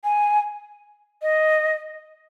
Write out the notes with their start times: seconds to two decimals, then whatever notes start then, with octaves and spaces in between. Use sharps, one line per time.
0.04 G#5
1.22 D#5